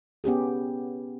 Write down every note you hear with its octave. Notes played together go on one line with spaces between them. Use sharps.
B3 C#4 G4 G#4